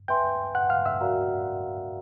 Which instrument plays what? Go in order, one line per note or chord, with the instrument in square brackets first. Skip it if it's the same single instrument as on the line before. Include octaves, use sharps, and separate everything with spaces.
[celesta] B4 E5 G#5 C6 [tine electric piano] G5 G6
[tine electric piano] F#5 F#6
F5 F6
E5 E6
[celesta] F#4 A#4 D5 F5 A#5